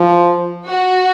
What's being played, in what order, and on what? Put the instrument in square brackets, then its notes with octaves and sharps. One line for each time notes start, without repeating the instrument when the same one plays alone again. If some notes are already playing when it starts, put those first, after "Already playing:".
Already playing: [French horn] F3
[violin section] F#4